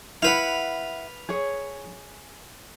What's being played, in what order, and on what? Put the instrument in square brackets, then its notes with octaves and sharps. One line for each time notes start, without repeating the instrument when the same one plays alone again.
[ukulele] E4 F#5 [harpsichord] B4 F5
[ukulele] G#4 C#5